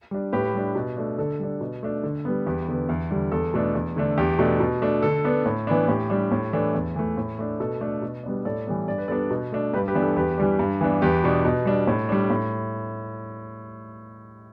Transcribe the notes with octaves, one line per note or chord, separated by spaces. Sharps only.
G3 D4
A2 G4 B4
G3 D4
B2
A3 D4
D3 A4 D5
G3 D4
B2
A3 D4
D3
G3 B3
E2 G4 B4
D3 B3
E2
D3 G3
E2 A4
B2 A3 D4
E2
D3 A3 D4
E2 G4
B2 A3 D4
B2
A3 D4
D3 A4
B3 D4
A2
E3 B3 D4
A2 G4
G3 D4
A2
E3 A3 D4
E2
E3 A3
A2
A3 D4
B2 A4
A3 D4
B2
G3 B3 D4
A2 A4 D5
E3 G3 B3
G2 D5
B4
G3 B3 D4 A4 D5
B2
A3 D4
G2 G4 B4
G4 B4
E3 B3 D4
A4
E2 G4 B4
E3 G3 D4
G2
E3 B3 D4
E2 G4 B4
B2 B3 D4
B2
G3 D4
A2
G3 D4
A2